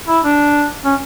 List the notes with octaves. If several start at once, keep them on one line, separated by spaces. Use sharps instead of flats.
E4
D4
C#4